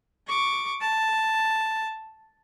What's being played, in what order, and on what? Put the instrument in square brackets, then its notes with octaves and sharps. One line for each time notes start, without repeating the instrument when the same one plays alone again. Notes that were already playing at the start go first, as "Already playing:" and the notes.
[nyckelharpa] C#6 D6
A5